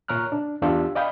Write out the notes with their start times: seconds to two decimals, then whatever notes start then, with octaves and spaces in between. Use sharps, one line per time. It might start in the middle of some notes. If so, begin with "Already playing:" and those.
0.08 A#2 C#5 A#5 F6 F#6
0.32 D4
0.62 E2 B3 D4 F4 G4 E6
0.95 D5 D#5 F5 G5 B5 G6